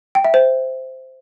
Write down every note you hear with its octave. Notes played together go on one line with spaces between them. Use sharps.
G5
E5
C5